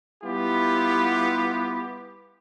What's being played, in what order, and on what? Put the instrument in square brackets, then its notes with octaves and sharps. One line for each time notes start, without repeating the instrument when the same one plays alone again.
[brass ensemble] G3 B3 E4 F4 G4